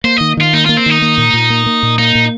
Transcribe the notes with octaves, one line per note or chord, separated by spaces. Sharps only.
A#3 C5
D#3 D#5
D#3 F4
A#3 D#4
A#3 F4
C4
D#3 D#4
A#3
A#2
A#2
A#3
A#3
A#2
A#3 D#4
A#2